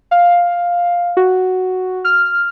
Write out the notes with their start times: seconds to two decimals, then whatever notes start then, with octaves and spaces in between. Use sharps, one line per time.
0.11 F5
1.17 F#4
2.05 F6